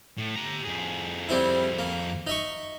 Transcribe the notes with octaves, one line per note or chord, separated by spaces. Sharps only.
A2
G4 A#5
F2 G#4
G3 C4 E4
A#3
D#4 E5 C#6